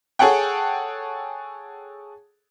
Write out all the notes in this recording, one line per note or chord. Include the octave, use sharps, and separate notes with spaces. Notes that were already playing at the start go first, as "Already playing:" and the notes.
G#4 A4 C#5 F#5 G5